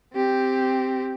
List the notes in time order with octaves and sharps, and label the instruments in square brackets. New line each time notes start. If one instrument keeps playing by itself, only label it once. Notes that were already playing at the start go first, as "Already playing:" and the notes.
[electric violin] C4 G4